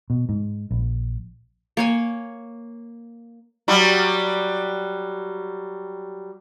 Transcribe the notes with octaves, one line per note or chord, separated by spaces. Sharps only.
B2
G#2
A#1
A#3 C#5 G#5
F#3 G3